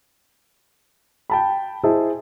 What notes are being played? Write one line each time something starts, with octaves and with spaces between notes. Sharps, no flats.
G5 A5 B5
E4 G#4 C5 D#5 A5